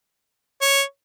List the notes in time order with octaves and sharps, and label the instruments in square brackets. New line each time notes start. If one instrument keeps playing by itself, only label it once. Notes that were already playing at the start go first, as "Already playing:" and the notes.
[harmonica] C#5